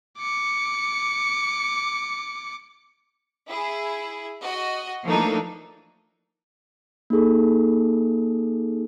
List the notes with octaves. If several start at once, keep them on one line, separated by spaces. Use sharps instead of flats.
D6 C#7
E4 G#4
F#4 D#5
E3 F3 A3 A#3 D4 D#4
A#3 D#4 G#4 A4